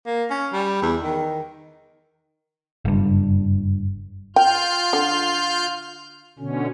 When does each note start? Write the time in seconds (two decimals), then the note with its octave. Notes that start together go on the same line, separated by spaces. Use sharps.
0.06 A#3
0.30 C#4
0.53 G3
0.82 E2
1.02 D#3
2.85 F#1 G2
4.36 F4 G5 F6 G6
4.93 D3
6.39 B2 D3 C#4